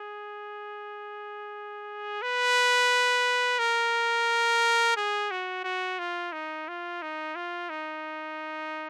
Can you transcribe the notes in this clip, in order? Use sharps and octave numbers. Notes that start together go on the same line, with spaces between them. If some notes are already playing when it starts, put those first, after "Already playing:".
Already playing: G#4
B4
A#4
G#4
F#4
F#4
F4
D#4
F4
D#4
F4
D#4